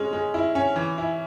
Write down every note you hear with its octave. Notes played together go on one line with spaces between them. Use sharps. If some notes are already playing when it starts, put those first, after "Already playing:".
Already playing: G#3 C#4
G#3
E4
C#4
E3
E4